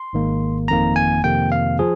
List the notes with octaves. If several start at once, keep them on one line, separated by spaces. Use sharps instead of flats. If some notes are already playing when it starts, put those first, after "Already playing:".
Already playing: C6
G#1 G#2 D#3 A#3
G1 F2 D#3 A#3 A#5
G#5
F2 C3 D#3 A#3 G5
F5
F3 G#4